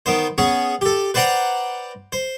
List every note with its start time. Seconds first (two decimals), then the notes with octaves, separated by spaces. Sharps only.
0.06 D#3 B3 C5
0.38 B3 C#4 G#4 C#5
0.81 G4 A4
1.14 B4 C5 D5 F#5 G5 A#5
2.12 C5